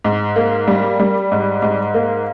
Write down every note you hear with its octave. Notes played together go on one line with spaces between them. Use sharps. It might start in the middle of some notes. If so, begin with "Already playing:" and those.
G#2
A#3
G3
G3
G#2
G#2
A#3